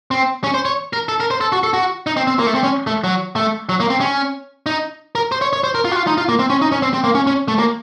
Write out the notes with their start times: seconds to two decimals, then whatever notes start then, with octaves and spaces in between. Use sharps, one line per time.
0.11 C4
0.44 C#4
0.54 C5
0.65 C#5
0.93 A#4
1.09 A4
1.20 A#4
1.31 C5
1.41 A4
1.52 F#4
1.64 A4
1.74 F#4
2.07 D#4
2.17 C4
2.27 C4
2.39 A#3
2.47 A3
2.55 C4
2.63 C#4
2.87 A3
3.04 F#3
3.36 A3
3.69 F#3
3.80 A#3
3.90 C4
4.01 C#4
4.66 D#4
5.15 A#4
5.32 C5
5.41 C#5
5.53 C#5
5.64 C5
5.75 A#4
5.85 F4
5.91 F#4
5.96 F4
6.07 D#4
6.18 F4
6.29 A#3
6.39 C4
6.50 C#4
6.62 D#4
6.72 C#4
6.82 C4
6.93 C4
7.04 A#3
7.15 C#4
7.27 C#4
7.48 A3
7.59 A#3